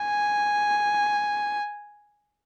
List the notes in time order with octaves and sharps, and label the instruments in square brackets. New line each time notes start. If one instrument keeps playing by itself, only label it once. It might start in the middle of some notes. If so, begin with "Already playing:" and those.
Already playing: [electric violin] G#5